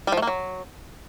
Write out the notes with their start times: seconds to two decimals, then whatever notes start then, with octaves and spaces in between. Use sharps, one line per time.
0.07 G3
0.12 F3
0.17 A3
0.22 A#3
0.27 F#3